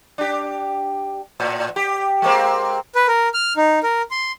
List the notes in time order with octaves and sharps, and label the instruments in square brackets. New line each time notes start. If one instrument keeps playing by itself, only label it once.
[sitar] D4 G4
A2
G4
G#3 A#3 C4
[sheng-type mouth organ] B4
A#4
F6
D#4
A#4
C6